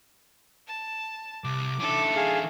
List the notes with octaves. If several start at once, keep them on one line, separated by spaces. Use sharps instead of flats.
A5
C2 D6
D3 E3 A3 A4 D6
G#4 F5